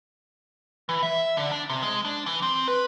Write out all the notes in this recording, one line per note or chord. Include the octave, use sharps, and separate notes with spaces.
E3
E5
D3
D4
C3
G#3
D4
E3
C4
B4